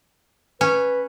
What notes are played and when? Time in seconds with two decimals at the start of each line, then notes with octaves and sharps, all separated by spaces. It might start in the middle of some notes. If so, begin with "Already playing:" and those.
0.61 C#4 B4